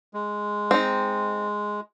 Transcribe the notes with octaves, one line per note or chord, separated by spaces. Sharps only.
G#3
C4 D#4